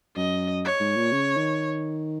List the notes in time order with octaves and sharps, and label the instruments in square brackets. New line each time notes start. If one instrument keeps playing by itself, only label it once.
[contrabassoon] F#2 [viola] D#5
[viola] C#5
[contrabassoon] G#2
A#2
C#3
D#3